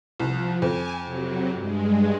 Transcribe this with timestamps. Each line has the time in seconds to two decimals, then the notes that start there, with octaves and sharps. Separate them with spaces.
0.20 C2 F3
0.62 F2 G#5
1.04 C3 F#3
1.53 G2 G#3